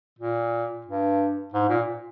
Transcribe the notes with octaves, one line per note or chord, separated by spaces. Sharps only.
A#2
G2
G#2
A#2